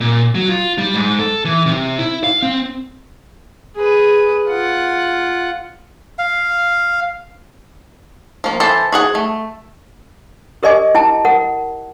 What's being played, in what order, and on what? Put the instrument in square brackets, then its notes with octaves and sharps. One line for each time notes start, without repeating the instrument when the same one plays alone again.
[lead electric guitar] A#2
F#3
F4
G3
G#2
A4
E3
C3
E4
F5
C4
[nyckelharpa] G#4 B4
F4 F#5
[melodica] F5
[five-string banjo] F3 A#3
E3 A4 C5 A5
F#4 G#4 F#5
A3
[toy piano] G4 A#4 D5 D#5 G#5 D6
E4 G5 A5
A#4 F#5